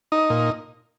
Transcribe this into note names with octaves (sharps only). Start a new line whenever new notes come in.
D#4
A#2